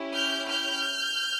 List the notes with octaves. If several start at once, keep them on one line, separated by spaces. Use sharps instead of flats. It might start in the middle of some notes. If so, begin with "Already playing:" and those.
Already playing: C#4 E4 G4
F6 G6
F6 G6